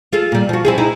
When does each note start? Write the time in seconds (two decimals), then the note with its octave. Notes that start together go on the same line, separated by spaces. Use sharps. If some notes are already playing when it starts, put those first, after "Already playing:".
0.12 F4 G#4 A4
0.32 A#2 G3
0.49 F3 F#4
0.65 C4 E4 G#4
0.78 D#4 E4 G#4